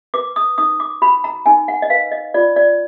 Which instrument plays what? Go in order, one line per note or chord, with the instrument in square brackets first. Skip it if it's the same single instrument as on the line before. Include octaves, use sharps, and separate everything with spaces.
[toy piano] B4 D6
D#6
D#4 D#6
D6
F#4 B5
A#5
D#4 G#5
F#5
D#5
B4 F5
D#5
F4 D5
D5